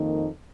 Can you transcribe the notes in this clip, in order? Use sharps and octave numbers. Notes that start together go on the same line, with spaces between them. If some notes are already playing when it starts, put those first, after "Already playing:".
Already playing: F2 D#3 A#3 D#4